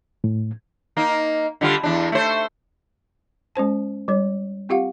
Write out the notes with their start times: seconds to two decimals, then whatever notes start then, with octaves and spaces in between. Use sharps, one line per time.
0.24 A2
0.97 A#3 D#4
1.61 D3 G3 F4
1.83 E2 D4
2.12 A3 C5
3.55 G#3 C#4 C5 A5
4.08 G3 C#5
4.69 C4 F4 G4 F5 F#5